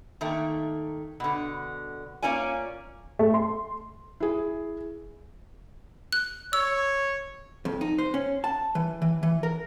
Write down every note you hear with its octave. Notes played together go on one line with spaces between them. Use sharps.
D#3 A3 A#3
B2 D3
A#3 C#4 F4 D5 G#5
A3
C6
E4 G#4
F#6
C#5 E6
F2
D#4
C5
C#4
A5
E3
E3
E3
A#4